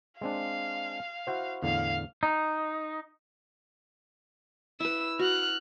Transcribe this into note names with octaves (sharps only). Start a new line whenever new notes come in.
G#3 C4 D4 F5
E4 F#4 C5
E2 A2 D3 F5
D#4
E4 B4 E6
F#4 F6 F#6